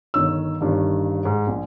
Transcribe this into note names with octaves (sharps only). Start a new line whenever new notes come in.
G1 D#3 C#5 E6
G1 G2 D#3
G#2
A#1